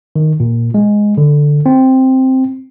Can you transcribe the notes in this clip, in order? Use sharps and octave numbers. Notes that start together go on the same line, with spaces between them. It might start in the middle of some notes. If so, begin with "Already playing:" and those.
D#3
A#2
G#3
D3
C4